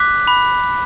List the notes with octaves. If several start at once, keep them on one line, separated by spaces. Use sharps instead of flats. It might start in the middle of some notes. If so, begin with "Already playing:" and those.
Already playing: D6 F#6 B6
B5